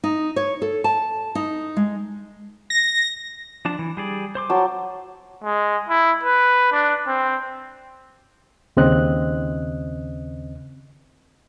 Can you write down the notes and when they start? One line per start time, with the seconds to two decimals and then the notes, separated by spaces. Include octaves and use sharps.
0.04 D#4
0.36 C#5
0.62 A4
0.84 A5
1.35 D#4
1.77 G#3
2.70 A#6
3.65 F3 D4 A5
3.79 E3
3.97 G3 G#4 D5
4.35 C5 C6 D6
4.50 F#3 A5
5.43 G#3
5.89 E4
6.23 B4
6.72 D4
7.07 C4
8.77 D#2 C#3 C4 D#5 F#6